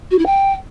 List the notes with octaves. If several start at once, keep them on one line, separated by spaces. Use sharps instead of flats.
F#4
E4
G5